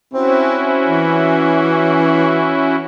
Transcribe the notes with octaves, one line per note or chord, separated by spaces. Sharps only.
C4 C#4 E4 F#4
E3